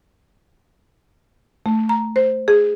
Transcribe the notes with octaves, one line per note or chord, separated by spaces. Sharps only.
A3
A#5
C5
G#4